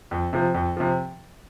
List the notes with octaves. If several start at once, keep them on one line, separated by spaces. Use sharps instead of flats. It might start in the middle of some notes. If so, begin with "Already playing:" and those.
F2
C3 F3
F2
C3 F3